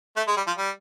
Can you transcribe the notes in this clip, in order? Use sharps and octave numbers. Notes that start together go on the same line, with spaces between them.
A3
G#3
G3
F3
G3